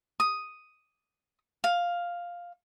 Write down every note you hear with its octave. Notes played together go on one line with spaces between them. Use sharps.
D#6
F5